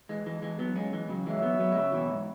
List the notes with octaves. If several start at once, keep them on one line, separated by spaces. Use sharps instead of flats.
E3 G#3
E3 G#3
E3 G#3
F#3 B3
G#3 C#4
E3 G#3
C#3 F#3
E3 G#3 F#4 C#5 E5
F#3 B3
F#3 B3
G#3
C#3 F#3
B2 E3
G#2